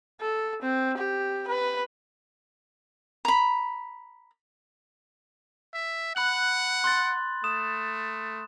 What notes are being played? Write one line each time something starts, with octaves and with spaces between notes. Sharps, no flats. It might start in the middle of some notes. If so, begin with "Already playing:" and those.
A4
C4
G4
B4
A#5 B5
E5
F#5 B5 F#6 F#7
C6 F#6 A6
A3 D#6 E7